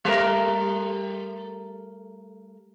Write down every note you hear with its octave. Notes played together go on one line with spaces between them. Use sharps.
G3 A3 A#4